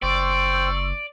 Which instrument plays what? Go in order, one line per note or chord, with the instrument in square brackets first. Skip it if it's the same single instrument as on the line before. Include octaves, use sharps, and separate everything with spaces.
[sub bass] F#1 [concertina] C5 G5 [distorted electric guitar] D5 [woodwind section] C6 C#6 E6